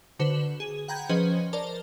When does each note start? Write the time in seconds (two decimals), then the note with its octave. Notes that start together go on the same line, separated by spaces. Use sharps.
0.19 D3 F#4 B4 C5 E7
0.60 G#4
0.88 F#5 G5 A#5 B5 G6 G#6
1.09 F3 C#4 G#4 B4 C5 D#5
1.53 A#4 C5 D5 A5 D6